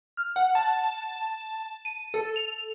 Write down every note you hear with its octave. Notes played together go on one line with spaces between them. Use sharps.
F6
F#5
A5
D#7
A4
F7